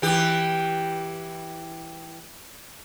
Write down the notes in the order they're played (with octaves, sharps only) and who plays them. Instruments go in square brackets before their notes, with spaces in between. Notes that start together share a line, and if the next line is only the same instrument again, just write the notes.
[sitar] E3 G4